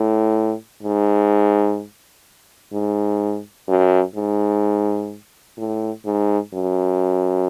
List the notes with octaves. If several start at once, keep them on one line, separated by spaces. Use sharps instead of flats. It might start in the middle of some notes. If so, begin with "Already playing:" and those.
Already playing: A2
G#2
G#2
F#2
G#2
A2
G#2
F#2